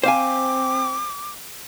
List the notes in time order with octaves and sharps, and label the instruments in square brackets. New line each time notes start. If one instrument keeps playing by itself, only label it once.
[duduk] C4 [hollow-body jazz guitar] C5 F5 G#5 [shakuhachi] D6